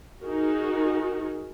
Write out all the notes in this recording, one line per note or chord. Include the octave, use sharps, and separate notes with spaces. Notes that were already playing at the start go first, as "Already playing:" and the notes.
D#4 F#4 G#4 A#4